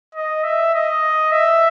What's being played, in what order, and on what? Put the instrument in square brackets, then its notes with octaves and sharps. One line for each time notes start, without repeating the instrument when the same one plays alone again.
[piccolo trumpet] D#5
E5
D#5
E5